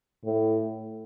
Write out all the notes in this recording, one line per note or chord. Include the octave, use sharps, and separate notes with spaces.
A2